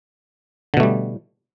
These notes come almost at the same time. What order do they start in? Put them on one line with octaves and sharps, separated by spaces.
D3 B2 A3 G3